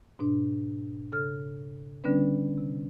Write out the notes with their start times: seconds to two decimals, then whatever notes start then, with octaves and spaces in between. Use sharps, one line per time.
0.19 G#2 B2 D4
1.12 C#3 A4 F6
2.04 D3 G3 B3 C#4 D4 B4
2.58 C3